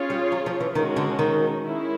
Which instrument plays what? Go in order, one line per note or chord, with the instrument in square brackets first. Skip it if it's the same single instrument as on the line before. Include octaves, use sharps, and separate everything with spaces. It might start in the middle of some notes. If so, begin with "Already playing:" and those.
Already playing: [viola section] C#4 F4 G#4 C#5
[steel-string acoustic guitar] G3
F#3
F3
E3
[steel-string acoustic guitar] D#3 [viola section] G#3 C#4 F#4
[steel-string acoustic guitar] D3
D#3
[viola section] D#3 G#3 C#4 E4